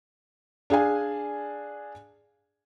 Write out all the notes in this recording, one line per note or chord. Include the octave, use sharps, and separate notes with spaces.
D4 G#4 F5 G#5